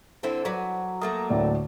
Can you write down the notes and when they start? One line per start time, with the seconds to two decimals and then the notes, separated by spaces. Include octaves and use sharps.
0.23 D3 C4 E4
0.45 F#3 B4 D5
1.02 F#3 A3 A#3 D#6
1.30 D2 A2 D5